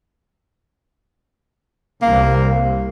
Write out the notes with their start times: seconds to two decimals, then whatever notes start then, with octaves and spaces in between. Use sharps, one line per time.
2.02 C2 A#3